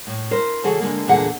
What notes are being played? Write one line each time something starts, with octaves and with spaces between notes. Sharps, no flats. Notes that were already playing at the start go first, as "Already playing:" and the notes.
A2
E4 A#4 C5
C#3 E3 F#4 G#4 A4
D3 G#3 A#3
E2 A#2 D3 F4 G#4 F#5